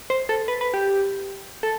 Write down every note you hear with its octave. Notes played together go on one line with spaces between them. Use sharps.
C5
A4
B4
B4
G4
A4